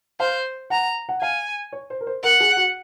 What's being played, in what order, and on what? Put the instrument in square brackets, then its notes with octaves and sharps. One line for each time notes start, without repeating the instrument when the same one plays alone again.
[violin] C5 [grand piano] F5
[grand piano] F#5 [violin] A#5
[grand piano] F#5
[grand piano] F5 [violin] G#5
[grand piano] C#5
C5
A#4
C5
[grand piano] A#4 [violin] F#5
[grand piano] G#4
F#4